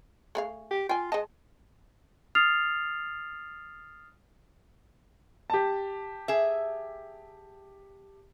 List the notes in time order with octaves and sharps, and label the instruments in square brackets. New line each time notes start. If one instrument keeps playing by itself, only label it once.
[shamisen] A3 G#4 F5
[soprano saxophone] G4
[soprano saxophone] F4 [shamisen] G5 G#5
[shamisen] G#3 A5 [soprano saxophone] D#5
[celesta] D#6 F6 A6 C7 F7
[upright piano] G4 A5
[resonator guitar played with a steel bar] G#4 E5